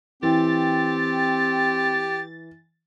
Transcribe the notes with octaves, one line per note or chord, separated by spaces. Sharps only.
E3 C4 G4 A6